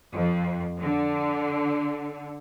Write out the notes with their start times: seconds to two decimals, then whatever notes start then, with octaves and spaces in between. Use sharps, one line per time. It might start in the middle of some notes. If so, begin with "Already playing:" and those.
0.11 F2
0.81 D3